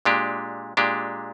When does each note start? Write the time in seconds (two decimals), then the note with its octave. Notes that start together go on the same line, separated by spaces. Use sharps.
0.05 A#2 G#3 D4 G4
0.77 A#2 G#3 D4 G4